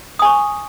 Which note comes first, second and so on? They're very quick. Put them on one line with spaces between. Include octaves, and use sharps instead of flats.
D#6 G#5 C#6